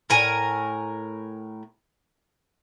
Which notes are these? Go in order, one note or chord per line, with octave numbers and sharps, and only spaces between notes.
A2 A#4 G#5